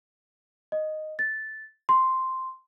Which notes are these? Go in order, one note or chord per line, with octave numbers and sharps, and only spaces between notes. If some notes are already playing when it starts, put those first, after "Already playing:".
D#5
A6
C6